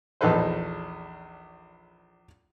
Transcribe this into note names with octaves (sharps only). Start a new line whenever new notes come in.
A#1 E2 D#4 A4 B4 C5